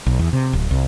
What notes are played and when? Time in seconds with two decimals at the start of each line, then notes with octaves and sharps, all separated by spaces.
0.06 B1
0.19 E2
0.33 C3
0.53 D1
0.71 C2